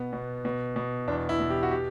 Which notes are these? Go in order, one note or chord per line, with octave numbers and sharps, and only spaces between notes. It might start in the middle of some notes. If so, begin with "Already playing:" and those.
Already playing: B2 B3
B2
B2
B2
E2 D4
E4
B2
G4
F#4
G4